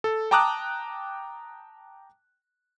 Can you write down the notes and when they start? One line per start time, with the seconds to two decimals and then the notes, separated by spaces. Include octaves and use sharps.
0.04 A4
0.31 G5 A5 A#5 D6 D#6 F#6